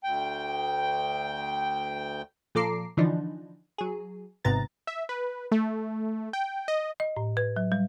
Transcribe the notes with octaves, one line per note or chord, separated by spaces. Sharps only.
D2 G5
A#2 F3 A4 A#5 D6 C7
D3 E3 F3 D4 D#4
F#3 G#4
G#1 G#2 C3 B3 A#5 A6
E5
B4
A3
G5
D#5
D#5
A2
B4
F#3
G3